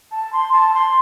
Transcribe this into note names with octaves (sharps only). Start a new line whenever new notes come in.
A5
C6
A5
C6